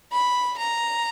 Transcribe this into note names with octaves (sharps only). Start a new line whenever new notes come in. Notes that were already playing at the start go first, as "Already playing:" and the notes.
B5
A#5